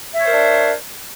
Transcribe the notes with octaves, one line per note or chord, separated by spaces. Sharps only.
D4 A#4 C5 C#5 E5